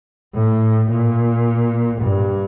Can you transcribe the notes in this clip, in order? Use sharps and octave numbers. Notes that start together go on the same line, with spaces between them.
A2
A#2
G2